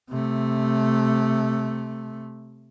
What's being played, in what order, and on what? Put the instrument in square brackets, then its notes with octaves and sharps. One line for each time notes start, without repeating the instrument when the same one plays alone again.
[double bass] C3 A3